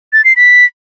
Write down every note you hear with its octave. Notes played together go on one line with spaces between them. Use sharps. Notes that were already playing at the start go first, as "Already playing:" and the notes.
A6
C7
B6